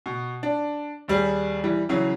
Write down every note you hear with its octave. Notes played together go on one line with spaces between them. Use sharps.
B2
D4
D#2 G3 G#4
E3 G3
C#3 E3 F#3